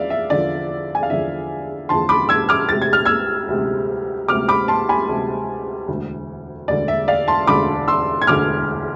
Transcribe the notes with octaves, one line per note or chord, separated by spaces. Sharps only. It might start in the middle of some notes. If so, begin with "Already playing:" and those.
Already playing: E2 F3 D5 E5 F5
E5
E2 D3 F3 D5
G#5
F5
E2 D3 F3 E5
E2 D3 F3 A5 C6
B5 D6
E6 G#6
D6 F6
D2 C3 G#3 A6
G#6
F6
E6 G#6
D2 C3 G#3
D2 C3 G#3 D6 F6
B5 D6
A5 C6
G#5 B5
D2 C3 G#3
E1 D2 D3
E1 D2 D3 D5
E5
D5 F5
A5 C6
E1 D2 D3 B5 D6
C6 E6
G#6
E1 D2 D3 D6 F6